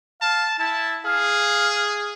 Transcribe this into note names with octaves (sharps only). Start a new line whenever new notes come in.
F5 A5
E4 A5
G#4 F5